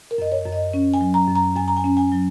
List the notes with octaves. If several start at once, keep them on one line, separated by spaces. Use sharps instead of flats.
A#4
F#2 D#5
C#5
F#2
D#5
C#4
G#5
F#3
A#5
F#2
A#5
F#2 G#5
A#5
G#5
C#4
G#5
F#3